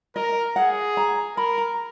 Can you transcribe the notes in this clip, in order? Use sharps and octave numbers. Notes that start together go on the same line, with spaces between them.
A#4 D#5
G#4 F#5
A#5
A#4 B5
A#5